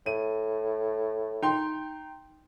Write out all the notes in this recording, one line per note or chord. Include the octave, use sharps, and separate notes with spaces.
A2 D#7
D#4 G5 C6